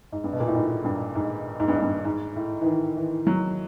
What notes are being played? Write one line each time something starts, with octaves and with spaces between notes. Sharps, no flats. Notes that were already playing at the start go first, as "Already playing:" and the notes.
G#2
G2
B2
A#2
A2
G#2
G2
G#2
G#2
G2
G#2
G2
G#2
A2
E3
D#3
E3
F#3